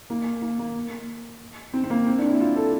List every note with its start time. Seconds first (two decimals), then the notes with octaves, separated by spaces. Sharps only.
0.10 A#3
0.42 A#3
0.59 A#3
1.73 C4
1.84 C4
1.90 A#3
2.07 C4
2.18 D4
2.29 E4
2.41 F4
2.56 A4